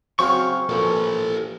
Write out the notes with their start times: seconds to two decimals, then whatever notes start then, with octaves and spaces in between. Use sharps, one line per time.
0.19 C#3 F#3 C4 C#6 F6
0.69 A#1 A4 B4